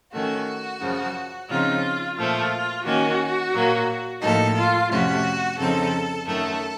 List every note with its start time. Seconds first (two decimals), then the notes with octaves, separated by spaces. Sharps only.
0.12 D#3 A3 C#4 F#4
0.80 F#2 C#3 F3
1.48 C#3 F3 C4 D#4 F4
2.17 A#2 F3 A3 F4
2.84 D#3 A#3 C#4 F#4
3.53 A#2 F#3 A#3
4.21 A2 F3 A#3 D#4 A4
4.55 F4
4.90 F2 C3 F3 A3 C#4 F#4
5.57 F2 C#3 F3 C4 D#4 A4
6.25 F#2 D#3 A3 A4